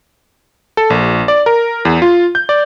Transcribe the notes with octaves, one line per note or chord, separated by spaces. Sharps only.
A4
A#1
D5
A#4
E2
F4
G6
D5